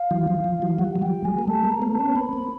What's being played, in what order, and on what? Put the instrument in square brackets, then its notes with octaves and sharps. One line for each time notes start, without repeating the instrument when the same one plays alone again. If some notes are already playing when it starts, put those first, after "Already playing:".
Already playing: [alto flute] F5
[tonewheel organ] E3 F#3
F3
F3
E3 F#3
[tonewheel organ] F3 G3 [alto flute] F#5
[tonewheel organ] F#3
[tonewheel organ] F3 G3 [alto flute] G5
[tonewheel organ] F#3 G#3 [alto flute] G#5
[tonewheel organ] A#3
[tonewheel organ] G3 A3 [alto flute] A5
[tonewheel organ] G#3 A#3
[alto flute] A#5
[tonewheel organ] A3 B3
[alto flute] A5
[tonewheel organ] B3 C#4
[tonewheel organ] A#3 C4 [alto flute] B5
[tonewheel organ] A#3 C4